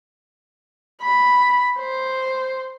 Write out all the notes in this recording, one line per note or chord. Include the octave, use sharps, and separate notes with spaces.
B5
C5